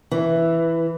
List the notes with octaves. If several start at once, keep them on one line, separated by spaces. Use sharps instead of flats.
E3